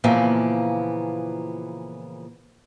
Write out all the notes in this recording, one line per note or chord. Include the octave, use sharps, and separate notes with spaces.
A#2 C#3 E3 F3 A#3 B3